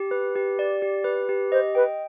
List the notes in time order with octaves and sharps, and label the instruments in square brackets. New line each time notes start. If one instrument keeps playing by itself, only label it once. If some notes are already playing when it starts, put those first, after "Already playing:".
Already playing: [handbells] G4
B4
G4
D5
G4
B4
G4
[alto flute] C5 [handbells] D#5
[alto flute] B4 [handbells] G5